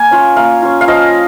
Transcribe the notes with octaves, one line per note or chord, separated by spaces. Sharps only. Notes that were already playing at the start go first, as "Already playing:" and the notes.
Already playing: A#3 G#5 A#5
C#4 F4
A#3 F5
C#4 F4
F5
F3 D#5